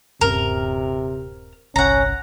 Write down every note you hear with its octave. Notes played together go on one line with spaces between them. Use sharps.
D#1 G2 C3 C#4 A#4
G1 C2 C#4 F#5 A#5